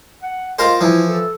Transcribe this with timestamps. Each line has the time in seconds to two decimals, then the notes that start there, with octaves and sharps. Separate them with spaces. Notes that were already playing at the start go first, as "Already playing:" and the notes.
0.23 F#5
0.59 F4 A#4 C5 D#5
0.81 E3 F3 E4
1.09 A4